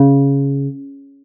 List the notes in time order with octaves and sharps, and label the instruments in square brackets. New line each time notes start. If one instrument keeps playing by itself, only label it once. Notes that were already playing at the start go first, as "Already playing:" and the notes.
Already playing: [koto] C#3